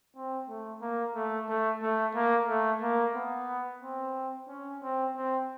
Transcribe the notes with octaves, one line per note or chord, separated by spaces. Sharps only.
C4
A3
A#3
A3
A3
A3
A#3
A3
A#3
B3
C4
C#4
C4
C4